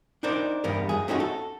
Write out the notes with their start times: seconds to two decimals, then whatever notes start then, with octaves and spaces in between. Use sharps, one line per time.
0.23 D4 D#4 A#4 C5 D5
0.64 E2 G2 G3 B3 A#4
0.89 F#2 G#4
1.08 A3 C4 C#4 D#4 F4 F#4
1.20 A4